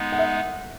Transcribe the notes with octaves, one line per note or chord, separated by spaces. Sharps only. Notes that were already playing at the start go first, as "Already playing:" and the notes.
Already playing: G#3 B3 D#4 F#5
F#5
E5